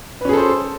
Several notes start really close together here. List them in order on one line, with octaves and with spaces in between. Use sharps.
B4 C#4 G#4 A4 C5